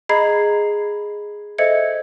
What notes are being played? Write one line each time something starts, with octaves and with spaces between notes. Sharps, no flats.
G#4 D#5 A#5 B5 G#6 C7
A4 C5 D#5 E5 G#6 C#7